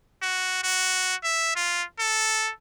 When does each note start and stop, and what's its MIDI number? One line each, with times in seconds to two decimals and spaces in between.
0.22 0.61 66
0.63 1.15 66
1.24 1.54 76
1.56 1.83 65
1.99 2.51 69